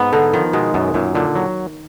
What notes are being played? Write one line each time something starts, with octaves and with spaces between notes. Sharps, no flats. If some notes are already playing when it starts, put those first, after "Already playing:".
Already playing: G#2 B3
D3 D#4
D#3 F3
B2 G#3
F#2 B2
F#2 A#2
A#2 D3
F#3